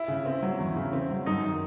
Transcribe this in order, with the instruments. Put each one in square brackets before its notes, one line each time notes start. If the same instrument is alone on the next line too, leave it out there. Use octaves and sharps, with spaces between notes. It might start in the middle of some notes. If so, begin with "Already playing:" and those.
Already playing: [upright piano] E4
[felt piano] C#3
C4
F#3
E2
C#3
C4
F#3
[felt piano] F#2 [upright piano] D#4
[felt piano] D#3